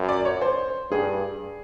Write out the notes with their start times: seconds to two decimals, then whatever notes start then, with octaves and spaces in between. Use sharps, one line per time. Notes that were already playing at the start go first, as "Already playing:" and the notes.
Already playing: F#2
0.09 D5
0.25 C#5
0.41 C5
0.91 G2 G#4